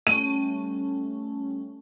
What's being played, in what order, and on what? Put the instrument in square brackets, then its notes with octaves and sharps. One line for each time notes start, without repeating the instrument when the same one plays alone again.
[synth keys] G3 A3 C#4 [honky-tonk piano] D#7